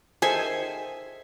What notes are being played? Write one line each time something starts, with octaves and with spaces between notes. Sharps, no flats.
D#3 G#4 A4 C5 E5 G#5